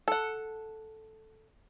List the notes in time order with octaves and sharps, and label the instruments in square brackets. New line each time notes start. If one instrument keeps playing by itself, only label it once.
[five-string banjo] A4 F#5